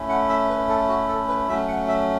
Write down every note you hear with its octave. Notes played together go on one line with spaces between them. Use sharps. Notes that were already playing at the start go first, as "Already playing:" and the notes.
Already playing: A3 C#4 E4
F#5
E5
B4
A4
F#4
A4
B4
F#3 A3 C#4 E5
F#5
E5